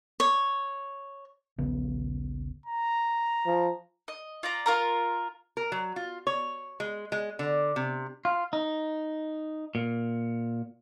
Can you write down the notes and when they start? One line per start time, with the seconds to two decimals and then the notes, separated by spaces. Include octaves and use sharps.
0.20 C#5
1.58 D#1 A#1 C#3 B3
2.66 A#5
3.47 F3
4.08 D#5
4.43 F4 D5 A#5
4.66 F4 A#4 A#5
5.57 A#4
5.72 F#3
5.96 F4
6.27 C#5
6.80 G#3
7.12 G#3
7.39 D3
7.76 C3
8.25 F4
8.53 D#4
9.75 A#2